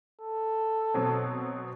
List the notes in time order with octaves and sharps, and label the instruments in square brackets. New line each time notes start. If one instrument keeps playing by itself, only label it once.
[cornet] A4
[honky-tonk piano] B2 F#3 C4